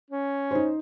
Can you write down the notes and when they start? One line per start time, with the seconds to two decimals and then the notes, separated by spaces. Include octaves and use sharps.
0.10 C#4
0.51 D#4 C5